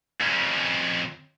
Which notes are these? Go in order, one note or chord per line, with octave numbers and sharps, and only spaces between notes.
F2 C#4